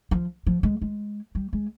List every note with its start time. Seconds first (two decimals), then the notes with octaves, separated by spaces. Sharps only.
0.11 F3
0.47 F3
0.63 G#3
0.82 G#3
1.35 G3
1.53 G#3